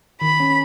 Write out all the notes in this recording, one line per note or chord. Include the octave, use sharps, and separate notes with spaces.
D#3 B5
C#4